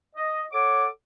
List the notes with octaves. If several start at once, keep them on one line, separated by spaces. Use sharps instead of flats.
D#5
A4 C#5 F#5 D6